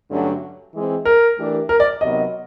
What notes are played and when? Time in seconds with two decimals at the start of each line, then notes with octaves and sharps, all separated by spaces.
0.10 G2 D3 F#3 A3 C#4
0.74 E3 G#3 C4
1.05 A#4
1.37 E3 A3 D4 G4 A#4
1.69 A#4
1.80 D5
2.01 C3 D#3 F#3 B3 D#5